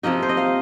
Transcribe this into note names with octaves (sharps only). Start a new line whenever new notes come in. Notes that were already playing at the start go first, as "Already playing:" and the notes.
C3 F3 A#3 D#4 D#5
C5
D#5
F5